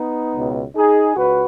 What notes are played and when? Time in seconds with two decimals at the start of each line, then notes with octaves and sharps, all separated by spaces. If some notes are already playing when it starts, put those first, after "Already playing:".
Already playing: B3 D#4
0.36 C#2 B2
0.76 D#4 G#4
1.17 C#2 F#4 B4